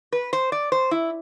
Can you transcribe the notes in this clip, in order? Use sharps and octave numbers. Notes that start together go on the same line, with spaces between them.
B4
C5
D5
C5
E4